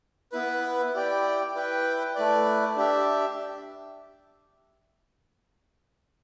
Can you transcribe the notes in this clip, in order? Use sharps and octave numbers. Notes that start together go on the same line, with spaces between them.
B3 E4 B4
E4 G4 D5 G5
E4 B4 G5
A3 E4 B4 D5
D4 G4 E5